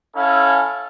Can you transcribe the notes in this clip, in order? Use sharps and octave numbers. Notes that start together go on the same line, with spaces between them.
C#4 E4 A4 F5 G#5